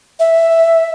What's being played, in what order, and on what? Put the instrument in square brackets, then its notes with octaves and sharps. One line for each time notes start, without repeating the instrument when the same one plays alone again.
[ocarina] E5